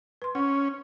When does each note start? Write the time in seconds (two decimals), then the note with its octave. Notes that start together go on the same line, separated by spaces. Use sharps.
0.22 B4 C6
0.35 C#4 F#5 C#6